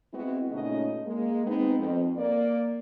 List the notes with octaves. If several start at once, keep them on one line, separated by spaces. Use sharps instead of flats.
G#3 B3 C4 E4 F#4
A#2 C#3 A3 C#4 D#4 D#5
G#3 A#3
G#3 B3 C4 D#4
F2 C4
A#3 D5